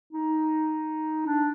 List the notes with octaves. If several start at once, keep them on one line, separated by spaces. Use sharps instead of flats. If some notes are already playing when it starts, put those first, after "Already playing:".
D#4
D4